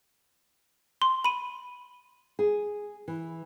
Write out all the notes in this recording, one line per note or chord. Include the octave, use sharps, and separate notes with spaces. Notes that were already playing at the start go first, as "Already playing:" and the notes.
C6
B5 D#7
G#4
E3